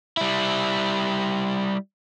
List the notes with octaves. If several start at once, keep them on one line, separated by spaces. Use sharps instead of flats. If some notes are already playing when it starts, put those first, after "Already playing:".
G3 E4